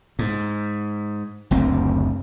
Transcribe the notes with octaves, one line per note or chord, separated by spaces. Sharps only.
G#2
F#1 D2 C4